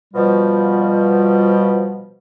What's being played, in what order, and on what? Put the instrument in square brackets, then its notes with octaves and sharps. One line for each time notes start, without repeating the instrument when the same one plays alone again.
[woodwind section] B2 F3 G3